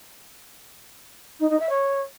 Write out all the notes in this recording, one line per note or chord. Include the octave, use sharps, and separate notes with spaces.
D#4
D#4
E5
C#5